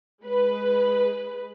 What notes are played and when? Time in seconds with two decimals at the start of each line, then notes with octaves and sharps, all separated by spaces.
0.24 G#3 B4